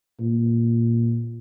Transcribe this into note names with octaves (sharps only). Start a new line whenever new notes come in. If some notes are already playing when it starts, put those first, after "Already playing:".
A#2